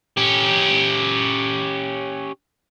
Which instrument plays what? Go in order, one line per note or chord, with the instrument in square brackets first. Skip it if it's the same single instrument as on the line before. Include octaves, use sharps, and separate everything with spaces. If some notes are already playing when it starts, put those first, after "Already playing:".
[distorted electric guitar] C#4 G4